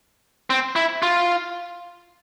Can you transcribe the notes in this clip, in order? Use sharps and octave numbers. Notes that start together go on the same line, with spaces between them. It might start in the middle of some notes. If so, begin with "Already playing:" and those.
C4
E4
F4